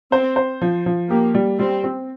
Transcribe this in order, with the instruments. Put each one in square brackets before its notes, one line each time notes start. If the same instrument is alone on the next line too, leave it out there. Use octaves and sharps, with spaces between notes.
[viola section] C4 [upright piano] C5
[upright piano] C5
F3
F3
[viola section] A#3 [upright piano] G4
[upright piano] G3
[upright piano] G3 [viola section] C4
[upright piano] C4